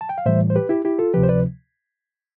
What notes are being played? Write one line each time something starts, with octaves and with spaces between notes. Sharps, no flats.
A5
G5
F5
A2 E3 G3 C5 E5
C5
G4 B4
E4 G4
E4 G4
F4 A4
D2 C3 F3 G4 B4
C5
B4 D5